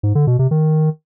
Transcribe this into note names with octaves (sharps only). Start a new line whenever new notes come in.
G#2
D3
B2
C3
D#3